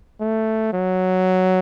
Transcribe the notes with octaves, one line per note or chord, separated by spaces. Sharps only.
A3
F#3